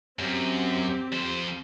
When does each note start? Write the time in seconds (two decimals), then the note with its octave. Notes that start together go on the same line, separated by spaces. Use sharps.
0.19 F#2 C4 G4
1.13 F2 C5